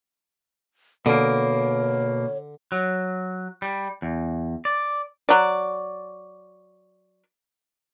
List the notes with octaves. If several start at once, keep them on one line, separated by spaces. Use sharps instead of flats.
B2 D3 A#3 C#5
F#3
G3
E2
D5
F#3 D5